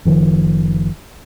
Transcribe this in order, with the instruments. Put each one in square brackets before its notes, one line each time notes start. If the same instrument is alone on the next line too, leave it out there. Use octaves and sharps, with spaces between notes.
[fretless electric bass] F#1 D#3 F3